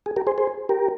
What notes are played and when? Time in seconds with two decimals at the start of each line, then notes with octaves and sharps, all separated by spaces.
0.06 G#4
0.16 G4 A#4
0.27 G#4 C5
0.38 G#4 C5
0.69 G4 A#4